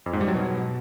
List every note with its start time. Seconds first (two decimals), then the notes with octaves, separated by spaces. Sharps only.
0.06 F2
0.13 G#2
0.21 G3
0.28 F#3
0.35 B2